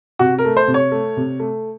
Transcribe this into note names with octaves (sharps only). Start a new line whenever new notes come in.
C3 F#4
A#4
A3
C5
C3
C#5
A3
C3
A3